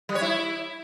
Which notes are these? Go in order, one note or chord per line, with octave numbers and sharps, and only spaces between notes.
G3
C#5
E4